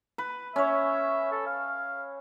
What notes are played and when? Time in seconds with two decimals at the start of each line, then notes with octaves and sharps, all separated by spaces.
0.18 B4
0.56 C#4 C#5 E5
1.32 A4
1.47 F5